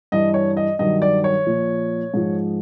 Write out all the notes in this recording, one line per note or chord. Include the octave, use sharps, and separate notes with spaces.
G2 E3 D#5
C#5
D#5
G2 D#3 F#3 D#5
D5
C#5
A#2 F3
G#2 F3